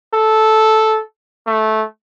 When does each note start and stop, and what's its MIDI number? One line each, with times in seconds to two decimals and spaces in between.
0.14 1.01 69
1.47 1.84 57